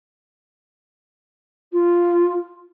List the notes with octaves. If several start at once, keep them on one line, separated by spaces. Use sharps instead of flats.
F4